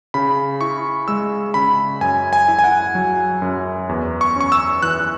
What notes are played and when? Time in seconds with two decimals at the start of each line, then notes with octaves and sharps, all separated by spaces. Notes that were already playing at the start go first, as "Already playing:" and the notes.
0.14 C#3 B5
0.61 E4 C#6
1.08 G#3 E6
1.54 C#3 B5
2.01 F#2 G#5
2.33 G#5
2.48 E4
2.59 G#5
2.64 F#5
2.95 F#3
3.42 F#2
3.89 E2
4.21 C#6
4.36 C#4 C#6
4.52 E6
4.83 E3 F#6